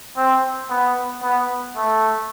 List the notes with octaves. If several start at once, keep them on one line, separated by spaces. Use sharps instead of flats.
C4
B3
B3
A3